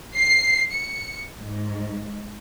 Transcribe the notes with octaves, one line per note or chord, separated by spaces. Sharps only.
C7
C#7
G#2